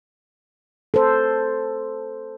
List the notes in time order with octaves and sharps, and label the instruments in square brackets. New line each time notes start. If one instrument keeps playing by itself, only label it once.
[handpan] A4 C5